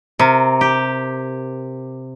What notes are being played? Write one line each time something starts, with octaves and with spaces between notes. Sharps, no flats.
C3 A#4
G4